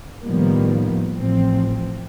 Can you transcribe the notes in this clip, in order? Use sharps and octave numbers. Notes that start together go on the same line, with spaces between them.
A2 D#3 F3 G3 A#3 B3
A1 F3 C4